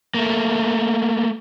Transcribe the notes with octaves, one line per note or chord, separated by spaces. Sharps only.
A3 A#3